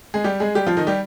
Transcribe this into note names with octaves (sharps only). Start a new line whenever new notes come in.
G#3 G#4
G3 G4
G#3 G#4
G3 G4
F3 F4
D#3 D#4
G3 G4